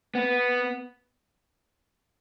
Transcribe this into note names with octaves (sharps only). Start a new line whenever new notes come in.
B3